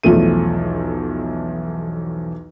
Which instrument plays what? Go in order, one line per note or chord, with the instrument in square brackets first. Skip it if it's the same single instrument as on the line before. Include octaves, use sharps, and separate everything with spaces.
[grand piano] B1 E2 F3 A3 D#7